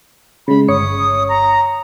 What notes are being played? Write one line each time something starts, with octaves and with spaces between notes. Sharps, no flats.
C#3 G#3 B5
G1 C#5 D#6 C#7
A#5